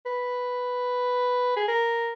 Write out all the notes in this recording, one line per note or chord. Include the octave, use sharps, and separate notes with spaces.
B4
G#4
A#4